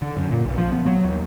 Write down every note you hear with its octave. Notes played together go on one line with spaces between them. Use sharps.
D3
F#2
A#2
B1
F3
B3
F#3
D#2